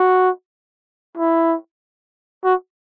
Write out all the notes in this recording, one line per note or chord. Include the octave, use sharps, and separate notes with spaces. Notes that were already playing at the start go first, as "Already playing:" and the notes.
Already playing: F#4
E4
F#4